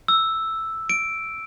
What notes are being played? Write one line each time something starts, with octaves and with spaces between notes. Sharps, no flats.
E6
D7